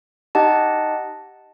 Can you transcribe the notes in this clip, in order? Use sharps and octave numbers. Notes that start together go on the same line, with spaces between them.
D#4 G4 D#5 F#5 A5